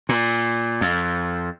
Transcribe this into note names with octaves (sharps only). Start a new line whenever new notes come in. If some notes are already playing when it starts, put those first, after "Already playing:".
A#2
F2